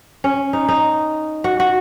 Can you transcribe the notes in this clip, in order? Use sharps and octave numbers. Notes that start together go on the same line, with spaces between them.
C#4
D#4
D#4
F#4
F#4